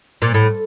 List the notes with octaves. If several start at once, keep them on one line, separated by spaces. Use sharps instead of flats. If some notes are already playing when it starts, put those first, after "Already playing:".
A#2
A2